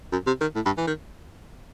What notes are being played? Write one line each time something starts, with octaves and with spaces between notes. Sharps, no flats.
F#2
C3
D#3
A2
G2
E3
D#3